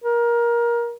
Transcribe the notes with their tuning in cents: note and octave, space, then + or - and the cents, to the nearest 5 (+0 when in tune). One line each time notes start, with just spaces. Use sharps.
A#4 +20